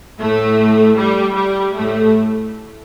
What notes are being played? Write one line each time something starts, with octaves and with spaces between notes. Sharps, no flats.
A2 A3
G3
G3
A2 A3